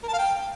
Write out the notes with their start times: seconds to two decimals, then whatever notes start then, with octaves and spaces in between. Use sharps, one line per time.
0.03 A#4
0.08 A5
0.13 F5
0.18 G5